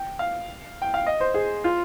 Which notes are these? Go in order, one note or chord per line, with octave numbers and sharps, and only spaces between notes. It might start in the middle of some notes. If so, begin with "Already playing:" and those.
Already playing: G5
F5
G5
F5
D#5
C5
G#4
F4